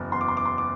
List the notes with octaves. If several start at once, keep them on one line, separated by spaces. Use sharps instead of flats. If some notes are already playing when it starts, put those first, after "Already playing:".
Already playing: F#1 E2
E2 C6
D6
C6
D6
C6
D6